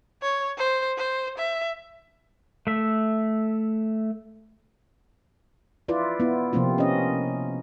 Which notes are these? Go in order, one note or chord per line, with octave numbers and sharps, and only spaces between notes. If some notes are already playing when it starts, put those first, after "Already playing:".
C#5
C5
C5
E5
A3 E5
E4 F4 B4 D5
B3 E4
C3 F3 A#3 C4 F4
C#4 D#5